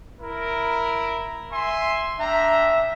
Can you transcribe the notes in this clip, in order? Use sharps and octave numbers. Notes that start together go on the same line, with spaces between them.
E4 A#4
E5 G#5 C6
D4 E5 G5 A#5